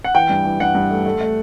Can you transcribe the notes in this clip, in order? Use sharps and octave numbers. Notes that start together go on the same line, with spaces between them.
F#5
E3 G5
G2
E3
G2 F#5
G2
A3
A3
A3